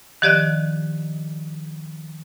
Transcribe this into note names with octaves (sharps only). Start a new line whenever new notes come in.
D#3 F3 G4 D5 D#5 F#6